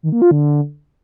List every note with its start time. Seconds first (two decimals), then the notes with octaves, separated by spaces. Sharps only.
0.03 D#3
0.12 A#3
0.22 F4
0.31 D3